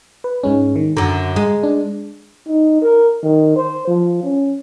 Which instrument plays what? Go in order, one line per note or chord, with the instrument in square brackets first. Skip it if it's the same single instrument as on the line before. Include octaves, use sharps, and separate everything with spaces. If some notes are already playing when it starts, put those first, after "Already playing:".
[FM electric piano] B4
G#2 G#3 C#4
D#3
[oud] F#2 D3 [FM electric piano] A#5
[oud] G#3
[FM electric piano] D4
[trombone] D#4
A#4
D#3
C5
F3
C#4